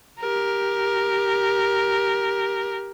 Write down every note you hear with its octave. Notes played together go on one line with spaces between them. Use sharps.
G4 A#4